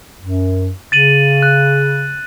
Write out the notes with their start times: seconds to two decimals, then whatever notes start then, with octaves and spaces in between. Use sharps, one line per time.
0.21 F#2
0.92 C#3 A6 D#7 F#7
1.43 F#6